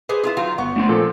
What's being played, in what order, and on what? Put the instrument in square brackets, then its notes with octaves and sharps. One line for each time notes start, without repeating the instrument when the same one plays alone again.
[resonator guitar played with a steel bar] G4 G#4 C5 [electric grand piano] B4
[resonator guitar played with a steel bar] E4 F4 G#4
D#3 F#3 F4
[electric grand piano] G1 F#5 C#6 [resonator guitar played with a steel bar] B3
[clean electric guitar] A3 D4 C6
[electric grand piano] A#2 F3 [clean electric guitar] A4